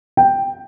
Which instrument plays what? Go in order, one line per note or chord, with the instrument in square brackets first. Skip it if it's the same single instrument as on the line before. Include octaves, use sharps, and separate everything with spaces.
[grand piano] G5